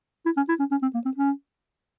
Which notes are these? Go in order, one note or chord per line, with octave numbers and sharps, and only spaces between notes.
E4
C#4
E4
C#4
C#4
C4
A#3
C4
C#4